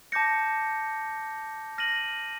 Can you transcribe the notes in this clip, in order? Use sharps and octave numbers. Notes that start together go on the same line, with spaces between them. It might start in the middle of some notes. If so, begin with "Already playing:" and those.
A5 D6 G6 A#6 C#7
F6 A#6 D#7 F#7